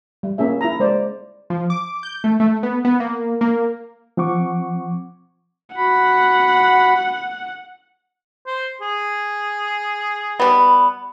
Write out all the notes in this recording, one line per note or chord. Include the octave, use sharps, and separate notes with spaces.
G3
A#3 C#4 G#4 E5
E4 A#5
G#3 C5 D5
F3
D6
G6
A3
A3
B3
B3
A#3
A#3
F3 C4 F#5 C#6 D6
F#4 F#5 B5
C5
G#4
G3 B3